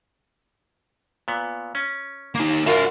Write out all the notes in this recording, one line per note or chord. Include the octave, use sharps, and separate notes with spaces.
A#2 B3
C#4
A#3 D#4
F#2 F4 F#4 A#4 F5